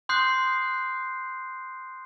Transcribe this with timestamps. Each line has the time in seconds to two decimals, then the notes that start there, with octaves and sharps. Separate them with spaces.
0.09 C6 D#6 F#6 G6 C7